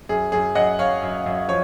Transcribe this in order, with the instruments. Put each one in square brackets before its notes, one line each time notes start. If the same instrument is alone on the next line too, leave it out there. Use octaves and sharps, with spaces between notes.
[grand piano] F#2 G#4
F#2 G#4
F#2 D#5 F#5
F#2 C#5 F5
F#2
F#2
F3 C#5